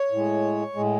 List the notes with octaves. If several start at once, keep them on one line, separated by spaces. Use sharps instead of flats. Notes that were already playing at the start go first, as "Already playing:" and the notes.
Already playing: C#5
A2 G#3
A2 G#3